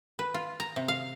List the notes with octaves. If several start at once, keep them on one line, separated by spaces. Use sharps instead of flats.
B4
F4
A#5
C3
F5